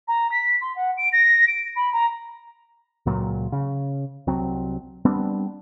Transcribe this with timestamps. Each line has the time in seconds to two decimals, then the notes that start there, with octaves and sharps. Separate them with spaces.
0.07 A#5
0.31 B6
0.61 C6
0.75 F#5
0.97 D7
1.12 A#6
1.47 D7
1.76 B5
1.92 A#5
3.06 C#2 A#2 F#3
3.52 C#3
4.27 C2 F#3 C4
5.05 G3 B3 C4 D4